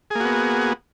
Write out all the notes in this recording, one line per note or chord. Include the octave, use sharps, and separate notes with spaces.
A#3 B3 F#4 G#4